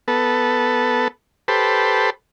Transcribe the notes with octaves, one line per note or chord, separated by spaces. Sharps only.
B3 A4
G4 A4 B4 C5